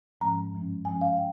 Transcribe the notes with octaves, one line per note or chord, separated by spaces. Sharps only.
G#2 F3 G#3 C#4 A#5
G2 F3 G#3 C#4
G2 F3 G#3 C#4 G#5
F5
G5